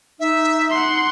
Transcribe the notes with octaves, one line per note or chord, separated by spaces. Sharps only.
D#4 E5
F#5 C6